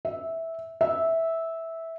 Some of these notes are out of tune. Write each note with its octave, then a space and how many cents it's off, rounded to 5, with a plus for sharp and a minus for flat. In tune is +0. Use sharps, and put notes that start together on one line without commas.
E5 -10
E5 -10